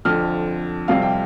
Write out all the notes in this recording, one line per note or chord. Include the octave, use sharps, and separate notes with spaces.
F2 D3 F3 F6
F2 C3 G3 F5
G5